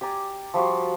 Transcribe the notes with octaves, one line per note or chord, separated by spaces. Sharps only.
G4 D5 G#5 A#5
F3 G3 F4 F#4